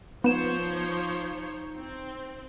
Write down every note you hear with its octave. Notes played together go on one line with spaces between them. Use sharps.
F3 B3 D#4 C5 C#5 E7
C4